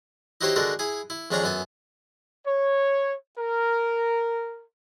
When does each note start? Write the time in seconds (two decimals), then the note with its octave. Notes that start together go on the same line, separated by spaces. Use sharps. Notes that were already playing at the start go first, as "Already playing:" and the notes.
0.41 D#4 E4 F#4 G4 C5 C#5
0.56 D3 G#3 F#4 A4 A#4
0.79 E4 G#4 G#5
1.10 E4
1.31 F2 G#3 C#4 D4 C#5 A#5
1.44 F#2 B3 A4 G#5
2.47 C#5
3.38 A#4